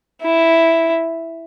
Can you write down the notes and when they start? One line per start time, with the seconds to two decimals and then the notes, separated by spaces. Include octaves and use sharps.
0.22 E4